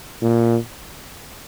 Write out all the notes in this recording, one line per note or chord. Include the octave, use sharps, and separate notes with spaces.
A#2